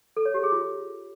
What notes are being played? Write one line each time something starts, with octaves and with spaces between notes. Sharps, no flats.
A4
C#5
G4
G#4
F4